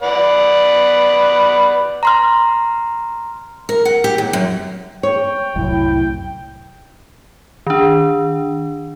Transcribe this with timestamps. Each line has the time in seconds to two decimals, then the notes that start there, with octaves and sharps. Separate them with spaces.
0.02 B4 D5 F#5
2.03 A#5 C6 F6
3.69 A#4
3.85 F#5
4.04 G4
4.18 D#2
4.33 F#2
5.03 C#5 G5
5.56 C2 F#2 A2 E4
7.67 D#3 D4